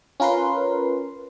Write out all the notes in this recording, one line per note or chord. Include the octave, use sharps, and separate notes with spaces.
C#4 F4 A#4 B4 C6